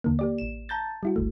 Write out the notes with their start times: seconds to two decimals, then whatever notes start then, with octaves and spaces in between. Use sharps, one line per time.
0.04 D#2 D3 A#3
0.19 A#3 G4 D5
0.38 A1 E7
0.69 A5 A#5 G6 A6
1.03 G3 E4 F#4
1.16 G1 C#2 A3